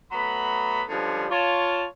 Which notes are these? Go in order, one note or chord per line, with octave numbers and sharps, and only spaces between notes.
F#3 A3 B3 B5
D3 F3 G3 G#3 B3 C#4
F4 C#5 A5